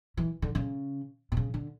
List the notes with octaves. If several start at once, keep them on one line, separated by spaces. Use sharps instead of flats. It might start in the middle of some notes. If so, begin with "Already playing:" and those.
E3
D3
C#3
B2
C#3
D3